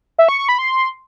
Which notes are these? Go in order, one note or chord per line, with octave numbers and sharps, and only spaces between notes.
E5
C#6
C#6
B5
C6